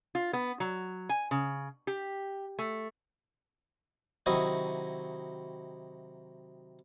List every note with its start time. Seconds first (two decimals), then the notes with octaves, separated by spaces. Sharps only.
0.15 F4
0.33 B3
0.60 F#3
1.09 G#5
1.31 C#3
1.87 G4
2.59 A3
4.26 C3 D#3 F#3 E4 D#5